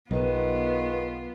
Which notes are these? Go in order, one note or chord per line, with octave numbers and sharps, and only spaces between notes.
B1 G#2 D#3 B3 F4 B4